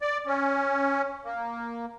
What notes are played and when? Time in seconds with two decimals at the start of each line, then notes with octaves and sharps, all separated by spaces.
0.01 D5
0.27 C#4
1.25 A#3